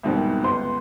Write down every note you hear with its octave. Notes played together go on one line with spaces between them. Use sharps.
C2 G#2 B2 D#3 G3
G1 C#2 B3 C6